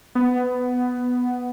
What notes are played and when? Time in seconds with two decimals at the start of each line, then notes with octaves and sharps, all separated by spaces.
0.15 B3